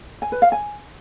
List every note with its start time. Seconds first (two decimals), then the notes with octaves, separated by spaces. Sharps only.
0.22 G#5
0.32 B4
0.42 F5
0.52 G#5